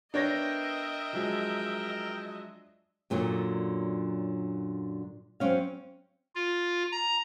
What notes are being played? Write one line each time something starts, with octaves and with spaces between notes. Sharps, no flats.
B3 D4 A#4 C#5 D#5 E5 G5 A#6
F3 F#3 G#3
F#2 A#2 D3 F#3
F#3 C4 C#4 F5
F4
A#5